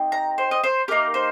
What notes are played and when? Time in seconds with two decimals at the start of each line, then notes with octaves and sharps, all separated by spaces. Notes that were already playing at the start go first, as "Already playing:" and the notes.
Already playing: C4 D#4 G4
0.12 A#5
0.38 C5
0.51 D#5
0.64 C5
0.88 A#3 D#4 G4 A#4
1.14 C5